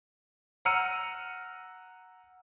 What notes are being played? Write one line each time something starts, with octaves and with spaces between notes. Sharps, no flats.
F#5 A#5 E6 F6 C#7 D#7